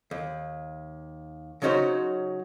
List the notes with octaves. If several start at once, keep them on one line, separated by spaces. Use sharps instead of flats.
D#2
C#3 F#3 C#4 D#4 F#4 C5